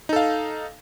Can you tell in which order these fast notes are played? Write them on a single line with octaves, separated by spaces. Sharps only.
D#4 A4 F5